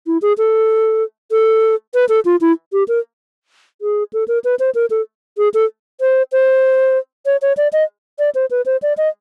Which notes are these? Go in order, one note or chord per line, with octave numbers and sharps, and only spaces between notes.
E4
G#4
A4
A4
B4
A4
F4
E4
G4
A#4
G#4
A4
A#4
B4
C5
A#4
A4
G#4
A4
C5
C5
C#5
C#5
D5
D#5
D5
C5
B4
C5
D5
D#5